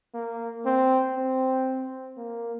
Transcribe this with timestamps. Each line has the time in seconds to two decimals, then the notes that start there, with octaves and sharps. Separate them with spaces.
0.14 A#3
0.65 C4
1.16 C4
2.17 A#3